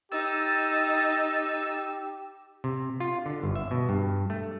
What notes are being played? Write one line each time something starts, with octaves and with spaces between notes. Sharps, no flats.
D#4 G4 E6 A6
C3
F4
D3
G1
E5
B2
G2
A3